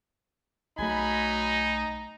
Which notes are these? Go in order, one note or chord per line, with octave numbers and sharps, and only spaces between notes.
B1 F#3 A3 D#4 G#5 B5